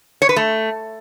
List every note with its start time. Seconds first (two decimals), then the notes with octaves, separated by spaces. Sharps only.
0.22 C#5
0.29 B4
0.36 A3